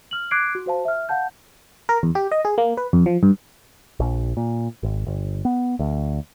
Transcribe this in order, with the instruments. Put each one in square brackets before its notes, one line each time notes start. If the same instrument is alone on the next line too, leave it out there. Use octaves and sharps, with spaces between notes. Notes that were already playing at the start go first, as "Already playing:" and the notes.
[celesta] F6 F#7
D6 F#6 G#6 C7 D7
F#4
F#4 C5 F5 A5
E5 F6
F5 F#5 A5 G6
[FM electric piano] A#4
E2
G4
D#5
G#4
A#3
B4
F2
F3
G2
[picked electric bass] A#1
A#2
G#1
G1
B3
D2